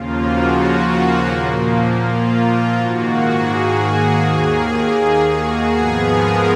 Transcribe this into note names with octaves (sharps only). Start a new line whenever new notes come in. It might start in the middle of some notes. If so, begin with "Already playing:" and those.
Already playing: D#2 C#3 F3 A#3 F4
F#4
F#4
A#2 F3 A#3
F4
F4
G#2 D#3 A#3 F#4
G#4
G#4
D#2 D#3 A#3
G#4
F#4
G#2 F3 B3 G#4
A#4